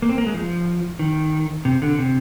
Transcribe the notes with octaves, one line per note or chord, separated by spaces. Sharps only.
A#3
C4
A#3
G#3
F3
D#3
C3
D3
C3